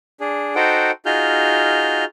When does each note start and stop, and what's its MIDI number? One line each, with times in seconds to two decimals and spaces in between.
0.20 0.55 62
0.20 0.55 68
0.56 0.91 63
0.56 0.91 66
0.56 0.91 69
0.56 0.91 72
0.56 0.91 78
0.56 0.91 79
1.06 2.05 63
1.06 2.05 65
1.06 2.05 66
1.06 2.05 68
1.06 2.05 89
1.06 2.05 91